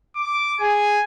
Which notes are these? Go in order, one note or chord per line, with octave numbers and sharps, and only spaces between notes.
D6
G#4 G#5